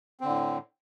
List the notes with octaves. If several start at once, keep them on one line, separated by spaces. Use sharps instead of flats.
A2 D3 C4